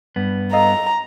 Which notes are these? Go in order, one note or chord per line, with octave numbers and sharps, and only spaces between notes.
G2 B3
A4 D#5 F5 A#5